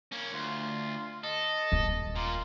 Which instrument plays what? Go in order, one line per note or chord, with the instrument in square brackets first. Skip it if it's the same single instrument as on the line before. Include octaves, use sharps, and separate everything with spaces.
[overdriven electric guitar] A#3 C#4
[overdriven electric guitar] D2 [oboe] F4
[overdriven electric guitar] A4 [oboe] D#5
[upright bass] D#1 A#3
[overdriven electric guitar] A#2 [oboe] F4